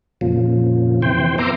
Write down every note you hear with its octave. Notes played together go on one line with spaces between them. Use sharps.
F2 A#2 C#3 F3
F2 C3 E3 C5 G5
B3 E5 A#5 C6 D6